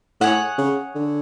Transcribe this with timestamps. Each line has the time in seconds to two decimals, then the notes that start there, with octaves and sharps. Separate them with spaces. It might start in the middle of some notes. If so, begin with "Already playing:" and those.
0.21 A2 G#4 C#5 F#5
0.58 C#3
0.95 D3